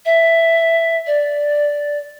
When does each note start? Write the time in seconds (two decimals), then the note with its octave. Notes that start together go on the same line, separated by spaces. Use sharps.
0.05 E5
1.06 D5